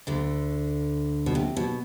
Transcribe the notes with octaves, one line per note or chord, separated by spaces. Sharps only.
D2 D3
B2
C3
B2